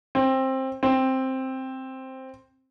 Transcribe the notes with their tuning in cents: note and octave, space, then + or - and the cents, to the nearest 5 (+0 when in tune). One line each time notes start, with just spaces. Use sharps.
C4 +15
C4 +5